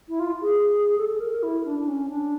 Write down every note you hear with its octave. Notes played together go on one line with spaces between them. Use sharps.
E4
F4
G#4
A4
A4
A#4
A#4
E4
D4
D4
C#4
D4